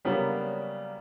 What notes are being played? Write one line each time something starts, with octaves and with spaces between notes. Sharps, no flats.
C#3 F#3 G3 A#3 B3 D4 A#4